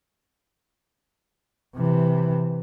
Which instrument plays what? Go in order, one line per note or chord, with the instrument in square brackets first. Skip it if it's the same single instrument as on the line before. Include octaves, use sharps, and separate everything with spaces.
[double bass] C3 E3